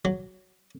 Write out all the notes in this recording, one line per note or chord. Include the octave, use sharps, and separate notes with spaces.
F#3